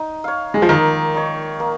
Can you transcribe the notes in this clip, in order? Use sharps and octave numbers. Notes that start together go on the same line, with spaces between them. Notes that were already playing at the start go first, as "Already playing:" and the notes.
Already playing: D#4
C#5 F5
G#3
F3
D#3 A#3
D#4 C#5
A#3